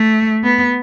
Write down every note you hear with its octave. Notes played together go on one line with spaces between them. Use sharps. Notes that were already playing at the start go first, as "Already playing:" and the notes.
Already playing: A3
B3